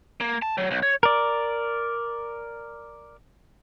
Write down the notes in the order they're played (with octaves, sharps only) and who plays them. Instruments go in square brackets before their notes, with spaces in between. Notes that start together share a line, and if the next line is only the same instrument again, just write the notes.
[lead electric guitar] A#3
A5
F#3
B1
C#5
[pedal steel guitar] A#4 D5